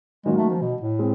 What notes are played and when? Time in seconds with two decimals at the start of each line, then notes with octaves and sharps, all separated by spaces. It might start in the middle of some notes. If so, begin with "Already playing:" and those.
0.25 D#3 F#3 G#3 A#3 C#4 F#4
0.38 A3
0.50 F3
0.62 B2
0.81 A2
0.99 G#3 C4